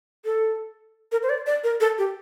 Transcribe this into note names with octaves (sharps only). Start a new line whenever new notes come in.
A4
A#4
C5
D5
D5
A#4
A4
G4